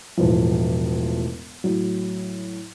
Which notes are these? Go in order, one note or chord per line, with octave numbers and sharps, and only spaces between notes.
E1 A1 F3
A2 F#3